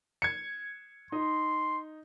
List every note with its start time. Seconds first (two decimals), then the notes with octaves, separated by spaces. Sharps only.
0.22 G#6 C#7
1.12 D#4 C6